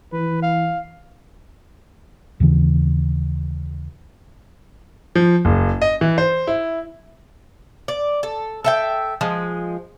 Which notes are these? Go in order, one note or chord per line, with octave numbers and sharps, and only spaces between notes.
E3 B4
F5
D#2 C#3 E3
F3
F#1
D#5
E3
C5
E4
D5
A4
A4 E5 G5
F3 G#3